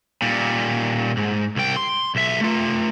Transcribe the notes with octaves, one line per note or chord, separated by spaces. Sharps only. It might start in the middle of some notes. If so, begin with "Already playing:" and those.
A#2 G3
G#2
C2 G5
C6
B1 E5
A3 F4